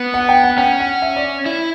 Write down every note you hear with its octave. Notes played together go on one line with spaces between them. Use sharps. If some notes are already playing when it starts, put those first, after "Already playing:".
Already playing: B3
F#5
G5
F#5
C#4 G5
F#5
E5
D5
E4